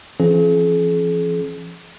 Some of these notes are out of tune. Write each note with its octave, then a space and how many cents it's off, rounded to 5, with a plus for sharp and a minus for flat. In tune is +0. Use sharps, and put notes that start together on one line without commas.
F3 -40 C#4 -40 G#4 +45